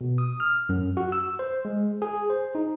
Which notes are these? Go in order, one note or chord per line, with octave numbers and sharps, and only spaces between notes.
B2
D#6
F6
F#2
F#4
E6
C5
G#3
G#4
C5
D#4